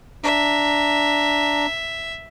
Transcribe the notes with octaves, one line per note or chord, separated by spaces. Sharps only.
D4 E5 A#5